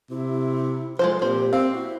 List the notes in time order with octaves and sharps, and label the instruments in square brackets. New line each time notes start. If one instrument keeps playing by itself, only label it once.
[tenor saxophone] C3 [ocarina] E4
[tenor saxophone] F3 [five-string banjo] G#3 A4 C5
[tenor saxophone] A#2 [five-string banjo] C4 C5 [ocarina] G4
[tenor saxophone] C4 [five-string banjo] F5
[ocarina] E4 [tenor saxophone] F#4